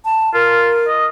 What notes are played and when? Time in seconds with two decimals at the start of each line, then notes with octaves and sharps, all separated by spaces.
0.05 A5
0.34 F4 A#4
0.88 D#5